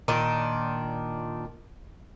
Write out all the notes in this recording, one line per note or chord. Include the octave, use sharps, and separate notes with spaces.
A#2 D#3 D4